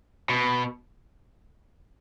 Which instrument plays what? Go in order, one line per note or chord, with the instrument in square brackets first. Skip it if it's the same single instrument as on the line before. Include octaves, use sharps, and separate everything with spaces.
[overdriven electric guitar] B2